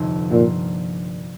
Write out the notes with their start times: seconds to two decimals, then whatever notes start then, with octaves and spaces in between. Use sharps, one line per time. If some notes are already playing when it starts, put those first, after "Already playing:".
Already playing: G1 F2 C3 F3 D#4
0.31 G2 A#2 F3 A#3 F4